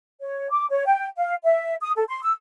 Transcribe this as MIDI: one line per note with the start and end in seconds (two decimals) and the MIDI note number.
0.21 0.50 73
0.50 0.66 86
0.71 0.86 73
0.86 1.06 79
1.17 1.35 77
1.44 1.74 76
1.81 1.92 87
1.96 2.04 69
2.08 2.20 84
2.23 2.32 88